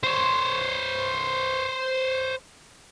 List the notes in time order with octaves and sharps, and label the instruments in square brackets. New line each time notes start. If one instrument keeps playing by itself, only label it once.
[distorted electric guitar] C5 C#5